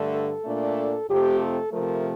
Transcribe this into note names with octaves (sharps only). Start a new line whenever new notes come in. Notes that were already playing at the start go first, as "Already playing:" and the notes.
Already playing: G2 D3 A3
A4
A#2 A3 D4
F2 C3 F3 A3 C4 G4
A4
C3 F3 A3 A#4